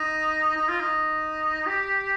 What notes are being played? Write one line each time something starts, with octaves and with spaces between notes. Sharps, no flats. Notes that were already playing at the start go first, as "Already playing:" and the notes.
Already playing: D#4
D#4
F4
D#4
G4